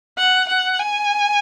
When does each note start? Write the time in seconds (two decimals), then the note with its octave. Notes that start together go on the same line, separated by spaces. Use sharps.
0.18 F#5
0.48 F#5
0.79 G#5